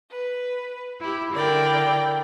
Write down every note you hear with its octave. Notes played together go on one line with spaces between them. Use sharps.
B4
E4 G4
D3 E4 A#4 D5 G5